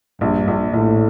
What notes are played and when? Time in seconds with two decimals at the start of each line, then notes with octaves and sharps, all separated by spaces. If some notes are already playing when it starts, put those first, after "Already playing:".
0.21 A#1 G2
0.48 A#1
0.73 A#1 A2